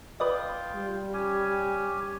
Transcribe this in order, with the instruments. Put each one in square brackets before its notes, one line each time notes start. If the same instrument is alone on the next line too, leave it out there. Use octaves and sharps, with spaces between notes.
[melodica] F4 G5 [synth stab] B4 D5 D#5
[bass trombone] G3
[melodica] C#4 G4 G#5